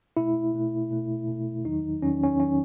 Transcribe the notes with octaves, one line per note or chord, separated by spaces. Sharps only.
B2 A3 E4
B2 A3
B2 A3
B2 A3
E2 D#3 F#3 D#4
E2 D#3 F#3 C#4
C#4
D#3 F#3 C#4